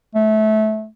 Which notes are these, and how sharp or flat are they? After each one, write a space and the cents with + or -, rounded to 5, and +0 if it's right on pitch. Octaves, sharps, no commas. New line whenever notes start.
A3 -20